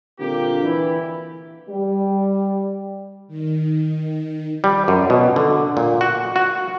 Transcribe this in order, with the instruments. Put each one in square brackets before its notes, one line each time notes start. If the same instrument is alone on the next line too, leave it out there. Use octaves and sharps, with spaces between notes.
[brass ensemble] A#2 D3 G3 A#3 C4 G4
E3 E4
[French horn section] G3
[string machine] D#3
[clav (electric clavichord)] G3
F#2
B2
D3
A#2
F#4
F#4